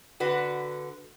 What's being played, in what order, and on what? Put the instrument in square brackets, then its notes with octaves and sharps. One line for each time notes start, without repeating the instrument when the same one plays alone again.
[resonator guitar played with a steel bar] D3 F#4 B4